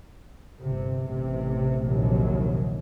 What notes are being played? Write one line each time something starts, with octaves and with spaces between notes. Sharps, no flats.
G1 C3
A1 C3
A#1 D#2 C3 F#3